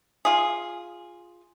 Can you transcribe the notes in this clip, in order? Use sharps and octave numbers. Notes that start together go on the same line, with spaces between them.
F4 G#4